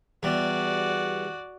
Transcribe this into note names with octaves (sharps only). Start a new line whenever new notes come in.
E2 G3 F#4 D5